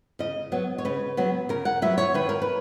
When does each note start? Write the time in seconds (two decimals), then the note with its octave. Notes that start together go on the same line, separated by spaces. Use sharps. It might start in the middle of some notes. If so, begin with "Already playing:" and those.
0.19 C#3 D#5
0.52 F#3 B3
0.78 C#5
0.85 C#3 B4
1.17 F#3 B3
1.49 C#3 A#4
1.65 F#5
1.82 F#3 B3 E5
1.98 C#5
2.14 D#3 B4
2.29 A#4
2.42 B4